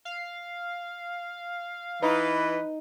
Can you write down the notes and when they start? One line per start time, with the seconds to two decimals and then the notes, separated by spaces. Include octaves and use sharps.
0.05 F5
2.02 E3 D#4 B4